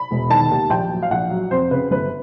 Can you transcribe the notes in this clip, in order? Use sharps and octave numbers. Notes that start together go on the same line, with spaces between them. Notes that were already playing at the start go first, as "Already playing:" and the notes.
Already playing: B5
E1
D#3 A5
D#2
A#1 G5
F#3
F5
A#1 F#5
F#3
F2 C5
C#3 B4
G1 B4